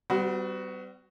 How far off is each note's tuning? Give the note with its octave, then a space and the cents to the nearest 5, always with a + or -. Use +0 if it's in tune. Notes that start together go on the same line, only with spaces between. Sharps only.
G3 -20 B3 +45 F#4 +0